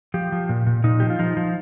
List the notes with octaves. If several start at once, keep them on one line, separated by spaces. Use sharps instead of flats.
F3 G4
F3
A#2
A#2
A#2 D#4
F3 G4
F4
F3 D#4
F3